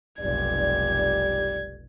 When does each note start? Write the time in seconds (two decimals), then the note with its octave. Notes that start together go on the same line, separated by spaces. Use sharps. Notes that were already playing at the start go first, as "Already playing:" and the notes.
0.21 F1 B1 G3 G4 D5 G#6